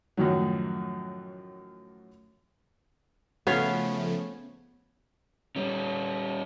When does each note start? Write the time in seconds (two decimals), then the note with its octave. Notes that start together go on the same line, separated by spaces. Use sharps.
0.17 F#2 A2 D#3 F3 F#3
3.47 C#3 F3 A3 B3 C#4 F5
5.56 G3 C#4